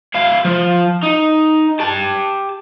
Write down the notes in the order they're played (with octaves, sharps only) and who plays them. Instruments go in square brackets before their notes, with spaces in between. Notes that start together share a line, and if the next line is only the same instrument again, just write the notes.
[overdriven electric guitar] E4 F5
F3
D#4
G4 A5